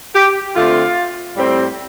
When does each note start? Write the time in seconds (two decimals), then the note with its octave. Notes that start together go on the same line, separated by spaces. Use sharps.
0.14 G4
0.55 D3 A3 C4 F4
1.37 A2 G3 C4